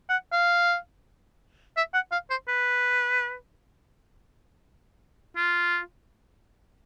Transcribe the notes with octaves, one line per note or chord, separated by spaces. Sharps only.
F#5
F5
E5
F#5
F5
C5
B4
F4